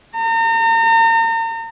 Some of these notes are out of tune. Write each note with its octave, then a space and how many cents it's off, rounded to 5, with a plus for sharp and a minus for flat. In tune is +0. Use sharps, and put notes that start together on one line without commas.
A#5 -40